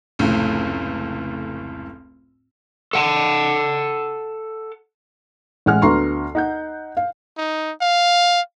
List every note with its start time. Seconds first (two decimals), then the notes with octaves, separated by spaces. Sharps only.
0.19 F1 C#2 A2 A3
2.93 A4 F#5 A5
5.66 A1 G#3 F#5 G#5 F6
5.82 D2 B3 A#5 C6 C#6 C7
6.35 D#4 F#5 G6
6.97 F5
7.38 D#4
7.81 F5